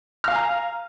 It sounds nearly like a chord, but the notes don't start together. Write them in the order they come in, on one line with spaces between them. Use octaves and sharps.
F6 F5 G#5 A#5